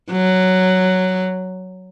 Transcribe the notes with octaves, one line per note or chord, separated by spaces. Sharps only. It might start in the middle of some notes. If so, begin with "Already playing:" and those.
F#3